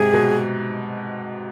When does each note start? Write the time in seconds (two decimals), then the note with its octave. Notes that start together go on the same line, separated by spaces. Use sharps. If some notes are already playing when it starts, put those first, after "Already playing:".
Already playing: G#2 C3 G#4
0.13 B2